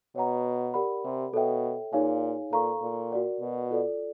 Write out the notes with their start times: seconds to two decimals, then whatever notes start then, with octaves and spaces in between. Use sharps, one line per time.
0.15 B2 C#5 F#5 A#5
0.74 G4 A#4 D5 F#5 B5
1.05 C3
1.33 B2 A4 C#5 E5 G5
1.93 A#2 D#4 G#4 C#5 F5 G#5
2.52 A#2 A4 C5 F5 A#5 C#6
2.81 A#2
3.11 F#4 A#4 D5 F#5
3.40 B2
3.70 F4 A4 D5